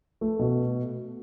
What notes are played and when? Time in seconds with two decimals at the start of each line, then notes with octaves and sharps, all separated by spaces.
0.21 A3
0.39 B2